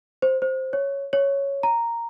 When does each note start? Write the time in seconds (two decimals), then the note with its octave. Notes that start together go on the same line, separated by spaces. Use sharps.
0.22 C5
0.42 C5
0.73 C#5
1.13 C#5
1.63 A#5